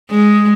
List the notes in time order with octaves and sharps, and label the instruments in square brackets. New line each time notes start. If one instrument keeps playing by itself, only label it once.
[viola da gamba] G#3